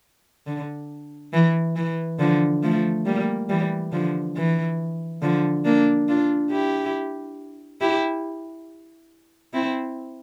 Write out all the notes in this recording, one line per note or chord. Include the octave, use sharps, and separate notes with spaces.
D3
E3
E3
D3 F3
F3 A3
G3 A#3
E3 G3
D3 F3
E3
D3 F3
A#3 D4
D4 F4
E4 G4
E4 G4
C4 E4